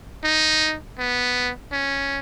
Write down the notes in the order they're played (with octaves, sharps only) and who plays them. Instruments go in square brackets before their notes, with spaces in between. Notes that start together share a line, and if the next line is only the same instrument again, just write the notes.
[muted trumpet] D#4
B3
C#4